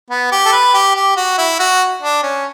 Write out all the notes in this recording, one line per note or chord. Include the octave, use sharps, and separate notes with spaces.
B3
G4
A4
B4
G4
G4
F#4
E4
F#4
D4
C#4